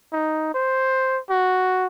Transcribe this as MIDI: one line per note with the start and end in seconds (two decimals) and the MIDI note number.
0.13 0.54 63
0.54 1.19 72
1.30 1.86 66